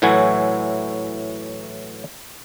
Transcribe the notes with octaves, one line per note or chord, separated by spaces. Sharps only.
A2 E3 F#3 E4 F#4 G#5